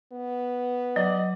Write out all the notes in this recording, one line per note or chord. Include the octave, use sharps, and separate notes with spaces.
B3
F#3 D5 D#5